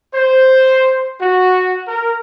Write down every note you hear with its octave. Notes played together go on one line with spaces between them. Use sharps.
C5
F#4
A#4